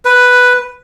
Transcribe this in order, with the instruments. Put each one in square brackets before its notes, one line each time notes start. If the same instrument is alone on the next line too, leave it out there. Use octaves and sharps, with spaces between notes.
[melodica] B4